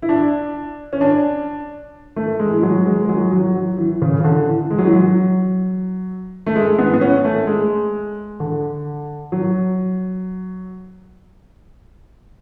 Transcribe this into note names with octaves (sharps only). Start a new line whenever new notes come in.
E4
D4
C#4
D4
A3
G#3
E3
F#3
G#3
G#3
F#3
F#3
F#3
E3
C#3
C#3
D3
E3
G#3
F#3
E3
F#3
A3
G#3
B3
B3
C#4
A3
G#3
D3
F#3